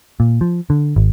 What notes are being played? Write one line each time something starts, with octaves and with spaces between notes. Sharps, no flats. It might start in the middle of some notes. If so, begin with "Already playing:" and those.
A#2
F3
D3
G#1